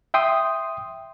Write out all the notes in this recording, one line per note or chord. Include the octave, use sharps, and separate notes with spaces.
E5 G5 C6 D#6